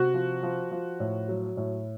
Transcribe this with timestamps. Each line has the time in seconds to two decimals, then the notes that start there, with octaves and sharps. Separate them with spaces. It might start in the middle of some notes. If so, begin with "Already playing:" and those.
Already playing: C3 F#4
0.14 F3
0.43 F3
0.71 F3
1.00 A2
1.28 F#3
1.57 A2